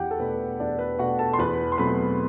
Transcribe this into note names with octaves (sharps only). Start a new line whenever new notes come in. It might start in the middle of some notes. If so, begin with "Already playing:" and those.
Already playing: E2 G4 F#5 G5
A4
B2 A3 D4 B4
E2 D4 D5
B4
B2 A3 D4 F#4 F#5
A4 A5
C6
E2 B4 B5
C6
B2 F#3 A3 C4 B4 B5